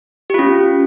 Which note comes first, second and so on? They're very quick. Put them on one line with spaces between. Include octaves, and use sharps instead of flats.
G4 F4 C#4